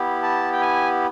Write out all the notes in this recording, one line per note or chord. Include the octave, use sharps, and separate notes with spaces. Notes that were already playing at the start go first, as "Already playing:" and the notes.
Already playing: B3 E4 G4
A5
G5
G#5